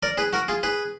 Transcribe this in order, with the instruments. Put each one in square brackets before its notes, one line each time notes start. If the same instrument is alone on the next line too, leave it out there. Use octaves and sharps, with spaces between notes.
[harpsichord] A#4 D5
G#4 B4
F#4 A#4
F4 G#4
G#4 B4